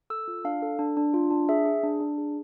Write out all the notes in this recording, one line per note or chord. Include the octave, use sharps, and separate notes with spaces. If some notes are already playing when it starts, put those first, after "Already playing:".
A4 E6
F4
D4 F5
A4
D4
D4
F4
D4
G#4 E5
G#4
D4
D4
G#4